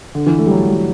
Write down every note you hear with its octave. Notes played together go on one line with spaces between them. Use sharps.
D3
E3
A3
G3
F#3
G3